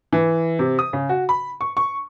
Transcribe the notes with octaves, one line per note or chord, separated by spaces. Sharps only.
E3
C3
D#6
C#3
F#4
B5
C#6
C#6